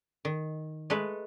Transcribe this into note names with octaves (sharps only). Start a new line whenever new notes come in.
D#3
G#3 A3 A4 B4